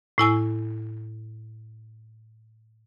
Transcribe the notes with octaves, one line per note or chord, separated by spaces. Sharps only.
A2 E4 G#5 E6